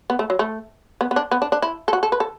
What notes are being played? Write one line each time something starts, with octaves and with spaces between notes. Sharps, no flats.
B3
A3
F#3
A3
B3
B3
D4
B3
D4
D4
E4
A4
F#4
A4
B4
A4